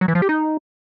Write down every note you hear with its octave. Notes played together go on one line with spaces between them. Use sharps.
F#3
E3
F3
G4
D#4